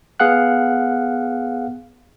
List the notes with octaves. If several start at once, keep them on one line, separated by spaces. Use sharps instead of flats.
B3 G#4 F5 F#5 F#6